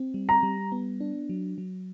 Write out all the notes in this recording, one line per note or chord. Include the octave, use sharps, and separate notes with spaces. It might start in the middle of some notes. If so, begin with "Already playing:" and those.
Already playing: C4
G3
A#5
G3
B3
D4
F#3
F#3